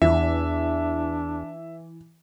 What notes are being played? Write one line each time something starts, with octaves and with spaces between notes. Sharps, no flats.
E2 E3 D4 E5